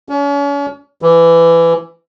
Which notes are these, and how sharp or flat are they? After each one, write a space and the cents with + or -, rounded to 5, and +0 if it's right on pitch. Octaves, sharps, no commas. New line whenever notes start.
C#4 +40
E3 +20